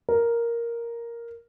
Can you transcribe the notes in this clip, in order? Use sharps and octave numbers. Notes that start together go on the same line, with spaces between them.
A#4